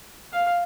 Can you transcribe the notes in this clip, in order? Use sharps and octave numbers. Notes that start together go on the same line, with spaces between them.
F5